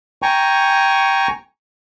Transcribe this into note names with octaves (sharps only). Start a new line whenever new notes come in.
G5 G#5 A#5 C#6